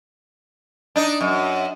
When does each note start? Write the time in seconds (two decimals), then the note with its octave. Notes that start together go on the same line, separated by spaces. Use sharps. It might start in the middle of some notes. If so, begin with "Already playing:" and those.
0.96 D4 D#4
1.21 F#2